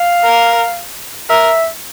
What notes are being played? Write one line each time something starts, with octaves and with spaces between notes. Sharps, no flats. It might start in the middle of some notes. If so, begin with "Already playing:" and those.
Already playing: F5
A#4
A#4 E5